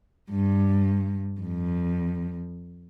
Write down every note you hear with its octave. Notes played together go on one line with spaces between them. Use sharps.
G2
F2